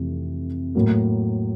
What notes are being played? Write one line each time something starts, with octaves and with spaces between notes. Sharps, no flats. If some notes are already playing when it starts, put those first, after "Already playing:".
Already playing: F2 C3 E3 A3
A2 F#3 A#3